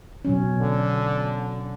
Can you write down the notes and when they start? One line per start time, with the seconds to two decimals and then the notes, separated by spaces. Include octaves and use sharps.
0.25 B2 F#3 C#4
0.61 D3